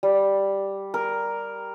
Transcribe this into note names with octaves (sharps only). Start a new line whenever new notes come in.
G3
A#4